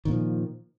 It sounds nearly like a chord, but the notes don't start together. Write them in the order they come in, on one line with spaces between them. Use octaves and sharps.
D#3 A#2 F3